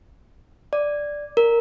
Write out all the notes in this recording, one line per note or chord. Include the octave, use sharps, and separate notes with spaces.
D5
A#4